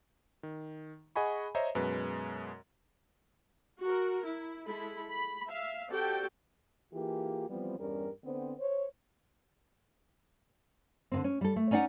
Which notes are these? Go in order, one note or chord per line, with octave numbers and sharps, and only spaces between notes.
D#3
G#4 D#5 F#5 G#5 B5 C#6
C5 C#5 D#5 E5 A#5
F#2 B2 G#3 B4
F#4 A#4
E4
G#3 E4 A4 B5
B5
E5 F5
C4 F#4 G4 A4 D5 G5
E3 A#3 F4 G4 G#4
E3 F3 G3 B3 C4
E2 G2 G3 C#4 A#4
D3 B3 C4
C5 C#5
D3 D#3 C4
C#4
G3 A4
A3
C#4 D#4 D5 F5 F#5